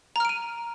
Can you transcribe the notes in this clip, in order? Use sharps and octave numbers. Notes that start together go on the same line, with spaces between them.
A#5 F6 D7 D#7